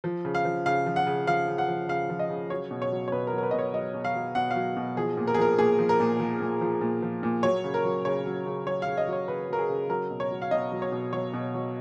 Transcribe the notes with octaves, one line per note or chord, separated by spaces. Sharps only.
F3
C#3
F5
F3
C#3 F5
F3
F#5
C#3
F3 F5
C#3
F#5
F3
C#3 F5
F3
D#5
C#3
F#3 C#5
B2
C#5
F#3
C#5
B2 B4
A#4
F#3
A#4
B4
B2 D#5
C#5
F#3 D#5
B2
F5
F#3
B2 F#5
F5
F#3
B2
F3 G#4
A#2
A#4
G#4
F3 A#4
A#2 G#4
F3
A#4
A#2
F3
A#2
F3
A#2
F3
A#2
F#3 C#5
C#3
A#4
F#3
C#3 C#5
F#3
C#3
F#3 C#5
C#3 F5
D#5
F#3
C#5
C#3 B4
F#3 A#4
G#4
C#3
F#3 A#4
B2
C#5
F#3
F5
B2 D#5
F#3
C#5
B2
F#3 C#5
B2
F#3